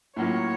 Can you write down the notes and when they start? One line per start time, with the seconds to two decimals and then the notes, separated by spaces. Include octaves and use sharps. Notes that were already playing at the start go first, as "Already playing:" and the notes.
0.16 A2 F#3 A#3 C#4 F4 C#5